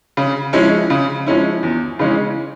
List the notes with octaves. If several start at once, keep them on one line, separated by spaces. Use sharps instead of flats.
C#3
F3 G#3 C#4 E4
C#3
F3 G#3 C#4 E4
E2
C#3 E3 G#3 C#4